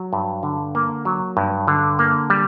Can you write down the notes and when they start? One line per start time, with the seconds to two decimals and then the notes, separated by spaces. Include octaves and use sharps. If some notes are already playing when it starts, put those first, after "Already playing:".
Already playing: F#3
0.13 G2
0.43 D3
0.75 A#3
1.05 F#3
1.37 G2
1.68 D3
1.99 A#3
2.30 G3